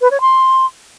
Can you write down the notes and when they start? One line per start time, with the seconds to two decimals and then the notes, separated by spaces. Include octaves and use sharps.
0.01 B4
0.11 C#5
0.21 C6